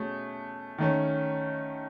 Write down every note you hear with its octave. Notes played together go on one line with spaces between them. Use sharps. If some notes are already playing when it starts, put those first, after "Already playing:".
Already playing: B2 A3 C#4 G#4
D#3 A3 C#4